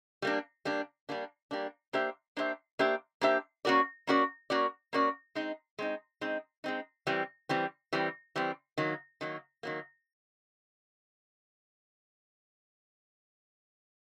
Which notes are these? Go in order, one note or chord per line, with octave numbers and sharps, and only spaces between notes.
G3 A#3 D4
G3 A#3 D4
G3 A#3 D4
G3 A#3 D4
A#3 D4 G4 C5 E5
A#3 D4 G4 C5 E5
A#3 D4 G4 C5 E5
A#3 D4 G4 C5 E5
A#3 C#4 F#4 A#4 D5
A#3 C#4 F#4 A#4 D5
A#3 C#4 F#4 A#4 D5
A#3 C#4 F#4 A#4 D5
G#3 C4 D#4
G#3 C4 D#4
G#3 C4 D#4
G#3 C4 D#4
E3 G3 C4
E3 G3 C4
E3 G3 C4
E3 G3 C4
D#3 F#3 A#3
D#3 F#3 A#3
D#3 F#3 A#3